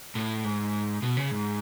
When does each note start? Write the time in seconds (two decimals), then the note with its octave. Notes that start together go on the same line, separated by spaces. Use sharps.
0.15 A2
0.44 G#2
1.02 B2
1.17 C#3
1.31 G#2